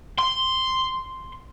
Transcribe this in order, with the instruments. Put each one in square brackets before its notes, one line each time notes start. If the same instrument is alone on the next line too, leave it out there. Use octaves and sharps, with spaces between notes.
[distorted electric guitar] C6